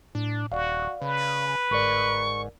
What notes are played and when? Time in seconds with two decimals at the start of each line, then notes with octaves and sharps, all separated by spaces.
0.15 A2 D4
0.52 D#1 F#4 D5 F5
1.02 C#3 B4
1.71 G1 G#2 A#4 D5 C#6